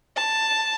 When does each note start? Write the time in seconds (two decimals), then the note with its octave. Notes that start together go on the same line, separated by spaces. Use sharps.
0.17 A5